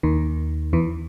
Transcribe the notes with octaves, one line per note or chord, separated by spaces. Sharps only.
D#2 D#3
E2 E3